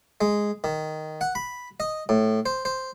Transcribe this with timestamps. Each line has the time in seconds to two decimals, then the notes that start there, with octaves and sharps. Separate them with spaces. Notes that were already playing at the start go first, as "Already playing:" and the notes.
0.21 G#3
0.64 D#3
1.21 F#5
1.35 B5
1.80 D#5
2.09 A2
2.46 C5
2.65 C5